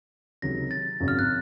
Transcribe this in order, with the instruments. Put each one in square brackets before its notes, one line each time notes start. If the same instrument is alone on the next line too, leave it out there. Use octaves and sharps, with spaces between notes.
[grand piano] C#2 C3 D#3 F#3 [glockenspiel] A#6
[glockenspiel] A6
[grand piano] G#1 F#2 C#3 F#3
[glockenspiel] F6
F#6